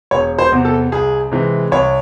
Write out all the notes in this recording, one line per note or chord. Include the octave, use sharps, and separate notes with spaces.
E1 C#5
C5
E2 C3
A4
C2 G#4
C3 E3 G#3
C2 C#5